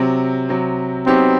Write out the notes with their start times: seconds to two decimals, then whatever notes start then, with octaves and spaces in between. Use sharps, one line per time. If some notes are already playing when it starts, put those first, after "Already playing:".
Already playing: C3 F#3 C4
0.49 C3 F#3 C4
1.06 F#3 B3 C4 D#4 G4